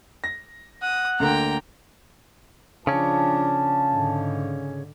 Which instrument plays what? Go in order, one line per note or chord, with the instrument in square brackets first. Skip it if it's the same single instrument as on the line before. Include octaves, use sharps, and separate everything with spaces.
[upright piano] A#6
[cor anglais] F#5 [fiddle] D#6
[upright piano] D2 D3 A#3 [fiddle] G5 A#5
[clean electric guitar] C#3 C#4 [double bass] F3 D4 [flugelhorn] A5
[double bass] G#2 D3